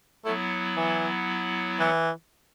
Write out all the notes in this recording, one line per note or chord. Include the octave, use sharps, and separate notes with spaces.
F#3 A3 B3 E4
E3
E3